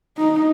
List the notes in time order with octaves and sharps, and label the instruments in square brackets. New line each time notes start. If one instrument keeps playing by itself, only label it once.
[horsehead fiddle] D#4